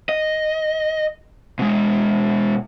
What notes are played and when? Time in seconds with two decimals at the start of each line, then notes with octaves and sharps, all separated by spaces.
0.09 D#5
1.59 B2 G#3